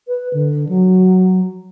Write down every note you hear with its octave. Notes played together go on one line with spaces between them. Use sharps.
B4
D3
F#3